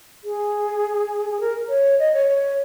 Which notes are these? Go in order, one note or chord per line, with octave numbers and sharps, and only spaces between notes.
G#4
G#4
A#4
C#5
D#5
C#5
C#5